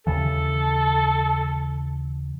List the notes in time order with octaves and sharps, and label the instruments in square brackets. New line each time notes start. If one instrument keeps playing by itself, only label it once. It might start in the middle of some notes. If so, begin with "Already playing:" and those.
[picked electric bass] D#2 C#3 E3 [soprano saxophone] A4